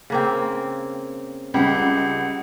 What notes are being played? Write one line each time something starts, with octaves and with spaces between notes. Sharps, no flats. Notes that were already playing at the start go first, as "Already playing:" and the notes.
C#3 A#3 C4
C#2 G3 F#5